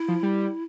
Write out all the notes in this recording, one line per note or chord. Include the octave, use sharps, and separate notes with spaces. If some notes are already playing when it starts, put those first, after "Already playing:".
Already playing: E4
F3
G3